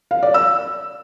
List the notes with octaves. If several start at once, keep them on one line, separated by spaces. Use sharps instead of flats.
F5
D5
E6